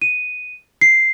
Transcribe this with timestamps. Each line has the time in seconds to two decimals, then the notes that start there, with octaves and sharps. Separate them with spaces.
0.02 D#7
0.81 C7